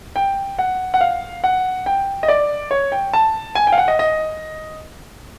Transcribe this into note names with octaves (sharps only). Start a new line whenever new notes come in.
G5
F#5
F#5
F5
F#5
G5
D#5
D5
C#5
G5
A5
G#5
G5
F5
F#5
D#5
D#5